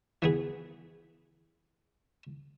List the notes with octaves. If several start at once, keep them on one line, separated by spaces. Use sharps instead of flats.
E3 B3 G#4